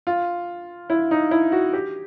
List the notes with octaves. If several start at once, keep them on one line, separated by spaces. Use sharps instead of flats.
F4
E4
D#4
E4
F#4
G4